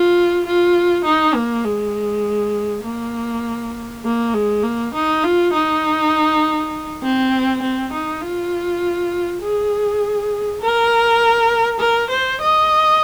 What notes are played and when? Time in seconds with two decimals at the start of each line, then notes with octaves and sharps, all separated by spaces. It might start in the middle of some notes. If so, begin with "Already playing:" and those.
Already playing: F4
0.46 F4
1.05 D#4
1.34 A#3
1.64 G#3
2.84 A#3
4.04 A#3
4.34 G#3
4.63 A#3
4.94 D#4
5.24 F4
5.53 D#4
7.03 C4
7.62 C4
7.93 D#4
8.22 F4
9.41 G#4
10.61 A#4
11.80 A#4
12.10 C5
12.41 D#5